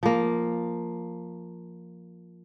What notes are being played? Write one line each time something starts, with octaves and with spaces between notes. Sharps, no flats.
F3 A#3